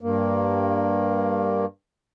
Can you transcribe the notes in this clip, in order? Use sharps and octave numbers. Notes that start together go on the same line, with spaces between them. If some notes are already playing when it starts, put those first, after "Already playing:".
G2 A#3